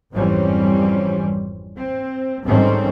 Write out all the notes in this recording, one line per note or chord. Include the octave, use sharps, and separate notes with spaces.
G#1 F2 E3 G3 C4 C#4
C4
G#2 D#3 G3 A3 C4 C#4